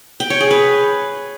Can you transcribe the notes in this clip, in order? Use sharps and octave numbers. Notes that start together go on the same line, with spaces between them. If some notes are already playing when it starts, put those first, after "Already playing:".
G5
C#5
G#4
B4